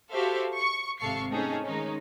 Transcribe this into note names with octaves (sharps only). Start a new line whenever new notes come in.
F#4 G4 A4 C5 E5 F5
C#6
G#1 C3 A4 F5 C#6 C7
A3 C4 C#4 D#4 G#4 A4
D#3 G#3 C#4 D#4